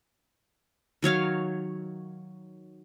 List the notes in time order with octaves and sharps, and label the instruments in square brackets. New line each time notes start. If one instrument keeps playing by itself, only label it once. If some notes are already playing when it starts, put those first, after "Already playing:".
[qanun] D#3 F#3 C#5 F5